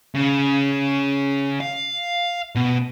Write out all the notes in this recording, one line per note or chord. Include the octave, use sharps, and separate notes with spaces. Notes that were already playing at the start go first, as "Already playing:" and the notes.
C#3
F5
B2